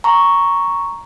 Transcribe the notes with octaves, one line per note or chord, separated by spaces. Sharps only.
A#5 C#6